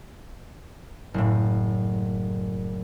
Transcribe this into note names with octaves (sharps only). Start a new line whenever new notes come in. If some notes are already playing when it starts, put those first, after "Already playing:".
F#1 A2